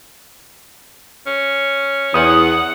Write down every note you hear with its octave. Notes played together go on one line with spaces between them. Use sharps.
C#4
E2 F#5 D#6